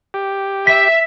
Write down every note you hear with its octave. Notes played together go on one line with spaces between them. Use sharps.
G4
E5 B6